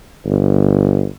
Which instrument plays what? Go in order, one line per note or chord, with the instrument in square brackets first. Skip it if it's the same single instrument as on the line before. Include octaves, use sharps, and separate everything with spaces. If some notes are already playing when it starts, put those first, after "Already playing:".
[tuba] G1